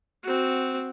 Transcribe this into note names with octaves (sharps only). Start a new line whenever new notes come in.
C4 F#4